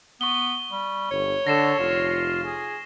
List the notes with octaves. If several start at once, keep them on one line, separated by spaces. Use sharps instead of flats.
B3 C#6 G7
G3
G1 C#5
D3 A4 A#6 C7 E7
F1 F4
G#4